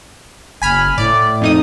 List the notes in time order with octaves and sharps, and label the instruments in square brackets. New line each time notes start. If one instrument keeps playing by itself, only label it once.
[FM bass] F#1 [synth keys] G#5 B5 F6
[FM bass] A2 [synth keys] D5
[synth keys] F2 D#4 D#6